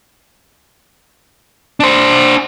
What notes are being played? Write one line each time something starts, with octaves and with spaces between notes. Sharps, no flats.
D4 C5